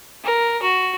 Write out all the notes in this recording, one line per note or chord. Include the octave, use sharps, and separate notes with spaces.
A#4
F#4